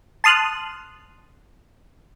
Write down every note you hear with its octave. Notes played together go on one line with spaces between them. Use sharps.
A5 C6 D#6 F6 F#6